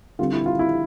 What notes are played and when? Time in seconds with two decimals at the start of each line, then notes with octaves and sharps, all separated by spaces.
0.19 D3 G3 C4 F4
0.33 E4
0.46 F4
0.59 E4